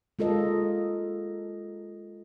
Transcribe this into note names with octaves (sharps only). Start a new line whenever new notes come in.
G#3 F4 A4 A#4 D#5